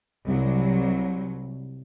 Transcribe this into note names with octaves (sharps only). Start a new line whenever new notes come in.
C2 F#3